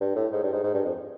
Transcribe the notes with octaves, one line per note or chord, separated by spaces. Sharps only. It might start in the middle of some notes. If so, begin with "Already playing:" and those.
G2
A2
G#2
G2
G#2
G#2
G2
F2